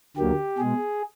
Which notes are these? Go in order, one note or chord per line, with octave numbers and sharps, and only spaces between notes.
D2 D3 F#3 A#3 G4
B2 G#3 G#4